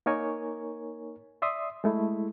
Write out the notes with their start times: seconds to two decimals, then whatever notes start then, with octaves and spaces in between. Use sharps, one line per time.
0.06 A#3 D#4 A#4 C#5 G#5
1.42 D5 E5 C6 D#6
1.84 G#3 A3 E4